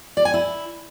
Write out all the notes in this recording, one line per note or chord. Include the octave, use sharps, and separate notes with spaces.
D5
G#5
E4